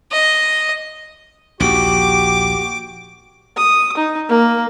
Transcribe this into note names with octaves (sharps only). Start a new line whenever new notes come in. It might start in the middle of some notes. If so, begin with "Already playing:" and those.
D#5
A#1 D#2 F#4 G4 D6
D#6
D#4
A#3